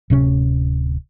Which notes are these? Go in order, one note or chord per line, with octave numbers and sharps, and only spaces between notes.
D1 C3 C#4